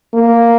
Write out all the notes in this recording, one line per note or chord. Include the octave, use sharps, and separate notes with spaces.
A#3